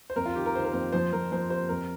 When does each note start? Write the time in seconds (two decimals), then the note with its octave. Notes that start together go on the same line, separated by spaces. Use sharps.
0.10 C5
0.16 F2 A#4
0.26 F4
0.35 D#3 G4
0.46 A#4
0.55 D#3 C5
0.64 A#4
0.73 F2 C5
0.92 F3 C5
1.13 F3 A#4
1.32 F3 C5
1.50 G4 C5
1.69 F2 A#4